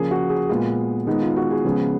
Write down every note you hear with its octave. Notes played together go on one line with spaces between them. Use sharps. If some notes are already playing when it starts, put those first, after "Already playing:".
Already playing: C#3 F3 A#3 G#4
F#4
G#4
A#2 G#3 B3 F4
D#3 G#3 B3 D#4
F4
F#4
G#4
C#3 F3 G#3 B3